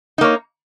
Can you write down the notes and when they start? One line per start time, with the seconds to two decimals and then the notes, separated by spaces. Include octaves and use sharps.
0.18 D#4
0.21 A#3
0.24 C#5